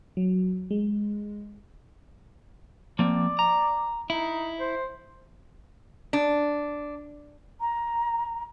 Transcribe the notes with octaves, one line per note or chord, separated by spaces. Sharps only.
F#3
G#3
F3 A#3 C4 D5
A#5
D#4 E4
C5
D4
A#5